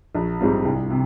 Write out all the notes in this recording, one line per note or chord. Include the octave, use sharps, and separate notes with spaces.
A#1
G#2 G3 C4 F4
C2
C3